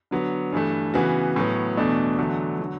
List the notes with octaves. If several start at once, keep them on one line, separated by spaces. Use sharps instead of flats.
D3 F#3 B3
G2 E3 A3
C#3 E3 B3 F#4
A2 F#3 B3
E2 B2 A3 D4
E2 D3 F#3 A3
D3 F#3